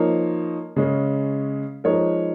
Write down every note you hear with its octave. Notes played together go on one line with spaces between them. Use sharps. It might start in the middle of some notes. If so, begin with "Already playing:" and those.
Already playing: F3 A#3 D#4 A#4 C#5
C#3 G#3 C#4
F3 G#3 D#4 A#4 C#5